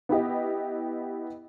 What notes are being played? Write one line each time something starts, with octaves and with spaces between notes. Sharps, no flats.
B3 E4 G4 D#5